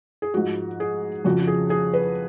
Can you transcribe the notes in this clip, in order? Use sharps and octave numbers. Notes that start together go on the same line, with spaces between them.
G#4
G#2 F3 F#4
G#4
F2 C#3 F3 F#4
F#4
G#4
G#4
B4